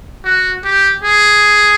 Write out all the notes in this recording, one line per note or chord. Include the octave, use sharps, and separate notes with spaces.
F#4
G4
G#4